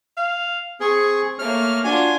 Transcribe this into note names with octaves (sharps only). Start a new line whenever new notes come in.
F5
C4 G#4 C#6
A3 A#3 C#5 F6
D4 F4 F#4 G#5